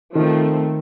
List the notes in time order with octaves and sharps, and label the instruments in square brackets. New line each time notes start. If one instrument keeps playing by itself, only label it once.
[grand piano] D#3 [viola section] F3 A3 C4